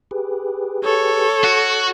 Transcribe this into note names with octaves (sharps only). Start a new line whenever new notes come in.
G4 G#4 B4
A4 C#5
F#4